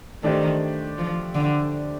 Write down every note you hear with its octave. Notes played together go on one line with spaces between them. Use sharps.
D#3 A3 D4 G4 C5
F3
D3